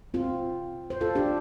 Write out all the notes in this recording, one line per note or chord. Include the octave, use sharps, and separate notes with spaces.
C4 F4
C5
F4 A4
D4 G4